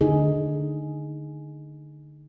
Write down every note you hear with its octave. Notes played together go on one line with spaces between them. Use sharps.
D3 D#4 G#4